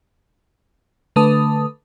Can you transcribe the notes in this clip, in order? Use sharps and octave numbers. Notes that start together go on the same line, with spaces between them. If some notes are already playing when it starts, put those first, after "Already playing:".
D3 A3 B4 A5 D#6